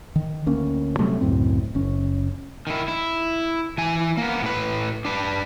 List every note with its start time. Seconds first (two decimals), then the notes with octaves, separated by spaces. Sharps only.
0.16 D#3
0.46 D2 A#3 C#4
0.99 C3 F#3 G3 A3
1.21 C#2 F#2 A2 C4
1.75 F#1 C#4
2.67 D#3 E4
2.88 E4
3.78 E3 G#5
4.17 A#3 B3
4.42 A2 B4
5.05 D4 B4